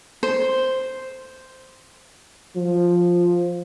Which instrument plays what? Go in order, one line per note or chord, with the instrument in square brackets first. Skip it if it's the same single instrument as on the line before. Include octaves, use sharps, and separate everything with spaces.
[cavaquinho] C5
[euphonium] F3